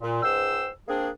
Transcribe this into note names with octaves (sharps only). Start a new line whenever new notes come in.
A#2
C#2 G#2 C5 G5 E6
A#3 C4 D4 G#4